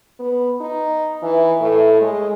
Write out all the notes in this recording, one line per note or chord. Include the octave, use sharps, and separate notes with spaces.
B3
D#4
E3
A2
G#3